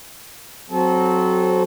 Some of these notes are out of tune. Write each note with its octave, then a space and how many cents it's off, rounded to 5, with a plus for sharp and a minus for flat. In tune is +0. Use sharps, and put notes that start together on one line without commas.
F#3 +0 C4 +0 A4 -25